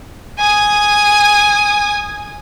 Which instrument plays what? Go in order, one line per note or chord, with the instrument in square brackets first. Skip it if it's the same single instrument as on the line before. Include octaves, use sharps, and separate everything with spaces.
[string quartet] G#5 D#6